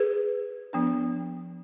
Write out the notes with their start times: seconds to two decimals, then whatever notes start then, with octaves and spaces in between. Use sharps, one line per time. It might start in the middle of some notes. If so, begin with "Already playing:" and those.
Already playing: G#4 B4
0.73 F3 B3 D4